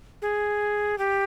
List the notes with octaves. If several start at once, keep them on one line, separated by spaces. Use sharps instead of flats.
G#4
G4